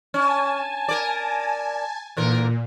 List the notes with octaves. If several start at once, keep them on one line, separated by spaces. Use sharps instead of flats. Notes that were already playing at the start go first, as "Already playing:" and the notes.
C#4 G#5 A5
A#4 D5
A#2 D3 E3 A#4